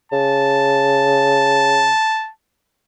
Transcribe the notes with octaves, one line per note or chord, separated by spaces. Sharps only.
C#3 A5